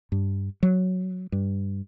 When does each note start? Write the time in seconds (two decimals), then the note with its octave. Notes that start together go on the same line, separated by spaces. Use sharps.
0.12 G2
0.63 F#3
1.32 G2